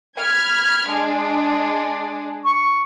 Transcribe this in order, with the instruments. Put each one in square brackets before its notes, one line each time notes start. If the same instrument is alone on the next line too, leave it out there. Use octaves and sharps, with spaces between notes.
[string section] B5 F6 G#6
G#3 D4
[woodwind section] C#6